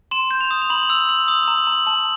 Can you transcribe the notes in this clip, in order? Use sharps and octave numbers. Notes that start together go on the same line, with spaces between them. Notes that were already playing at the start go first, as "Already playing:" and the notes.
C6 E7
G6
F7
D#6
F7
B5 F#7
F#7
E6 F7
E6 F#7
D#6 F#7
A#5 F#7
F#7
A#5
F#7
A5 F#7